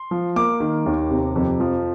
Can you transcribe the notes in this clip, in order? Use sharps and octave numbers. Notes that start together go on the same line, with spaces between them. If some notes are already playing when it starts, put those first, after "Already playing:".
Already playing: C6
F3
A#3 D6
D#3
D#2
C3
F2
F3